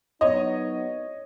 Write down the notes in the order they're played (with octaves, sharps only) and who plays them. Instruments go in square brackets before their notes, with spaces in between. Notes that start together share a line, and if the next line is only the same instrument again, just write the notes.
[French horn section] F#3 B3 D#4 [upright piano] C#5 D#5